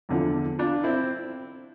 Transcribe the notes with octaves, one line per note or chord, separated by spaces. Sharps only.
E2 D3 F3
D4 F4
C4 E4